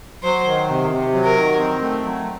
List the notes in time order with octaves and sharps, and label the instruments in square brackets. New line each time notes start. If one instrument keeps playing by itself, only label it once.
[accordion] F#3 [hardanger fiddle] C5
[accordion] D#3
C3
C3
F#3
[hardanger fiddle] A#4
[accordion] D#3
C4
A3
F#3